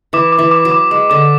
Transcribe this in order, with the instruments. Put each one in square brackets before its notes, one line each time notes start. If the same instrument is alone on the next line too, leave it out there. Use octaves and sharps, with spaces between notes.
[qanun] E3 [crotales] D6
[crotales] D6
[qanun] E3
[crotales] D6
[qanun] F#3
[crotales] D6
[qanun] G#3 [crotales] D6
[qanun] D3 [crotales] D6